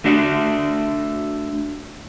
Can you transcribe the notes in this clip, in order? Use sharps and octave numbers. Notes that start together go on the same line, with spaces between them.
A3 D4 F#4 D5